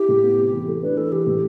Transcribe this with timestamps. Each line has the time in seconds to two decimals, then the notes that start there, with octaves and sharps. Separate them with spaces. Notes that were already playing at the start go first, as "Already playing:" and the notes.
Already playing: E4 G4
0.09 A2
0.23 B3
0.39 C3
0.53 E3
0.68 A3
0.82 D4 B4
0.97 E3 A4
1.12 E3 G4
1.27 A2